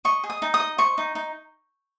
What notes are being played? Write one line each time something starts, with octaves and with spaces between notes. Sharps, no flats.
D#5 C#6
G#4
D#6
D#4
D#6
D#5
C5 C#6
D#4
D#4